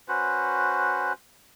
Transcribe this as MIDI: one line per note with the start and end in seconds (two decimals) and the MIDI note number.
0.08 1.13 61
0.08 1.13 66
0.08 1.13 71
0.08 1.13 72